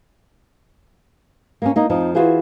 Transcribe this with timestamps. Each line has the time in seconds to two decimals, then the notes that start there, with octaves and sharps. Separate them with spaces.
1.62 A#3 B3 C#4
1.76 A#3 D#4
1.90 F2 F3 D#4
2.15 E3 F4 F#4 G#4 C5